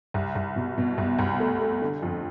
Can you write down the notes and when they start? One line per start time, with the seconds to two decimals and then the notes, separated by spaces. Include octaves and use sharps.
0.14 C2
0.35 C2
0.56 B2
0.78 B2
0.98 C2
1.19 C2
1.40 A3
1.61 A3
1.82 D3
2.02 F2